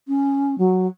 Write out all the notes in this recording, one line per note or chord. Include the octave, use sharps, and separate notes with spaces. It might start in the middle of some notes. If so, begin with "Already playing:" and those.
C#4
F#3